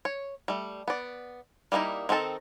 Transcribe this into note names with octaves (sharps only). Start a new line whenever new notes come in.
C#5
G3 A3
B3 D5
G3 A#3 B3 D#4 E4
D#3 C4 D#4 A4 A5